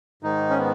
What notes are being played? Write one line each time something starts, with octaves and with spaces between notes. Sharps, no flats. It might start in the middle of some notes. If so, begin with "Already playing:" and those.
G#2 D#3 D#4
C#4
B3